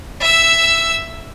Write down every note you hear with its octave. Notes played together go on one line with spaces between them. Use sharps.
E5 E6